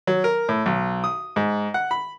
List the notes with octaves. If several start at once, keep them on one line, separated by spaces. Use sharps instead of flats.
F#3
A#4
A2
B1
D#6
G#2
F#5
B5